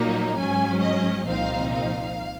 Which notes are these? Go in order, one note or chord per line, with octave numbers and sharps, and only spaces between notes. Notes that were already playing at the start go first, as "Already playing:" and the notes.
Already playing: A#2 F#3 A#3 D#4
G#2 F#3 C#4 G#5
D#5
C2 A#2 F3 C4 D#4 F5
F5